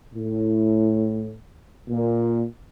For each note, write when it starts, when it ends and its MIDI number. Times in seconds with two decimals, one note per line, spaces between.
0.15 1.35 45
1.89 2.43 46